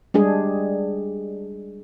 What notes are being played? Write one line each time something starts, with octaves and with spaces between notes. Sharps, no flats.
G3 G#3 D4 G#4